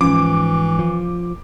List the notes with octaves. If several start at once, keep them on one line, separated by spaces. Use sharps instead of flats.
G#2 E3 F3 C#4 D6
F3